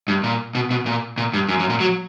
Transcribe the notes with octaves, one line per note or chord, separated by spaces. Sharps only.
G2
A#2
B2
B2
A#2
A#2
G2
F#2
F#2
A#2
F#3